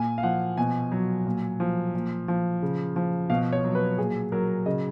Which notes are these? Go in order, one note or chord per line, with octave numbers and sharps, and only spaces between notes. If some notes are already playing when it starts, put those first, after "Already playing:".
Already playing: A#2 G#5
F5
F3 F#5
B2 G#5
F#3
A#2
F3
A#2
F3
C#3
F3
B2 F5
C#5
F#3
B4
A#2 G#4
F#3 A#4
C#3 D#5